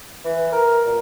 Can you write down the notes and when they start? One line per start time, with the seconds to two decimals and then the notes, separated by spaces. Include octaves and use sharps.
0.24 E3
0.52 A#4
0.86 A#2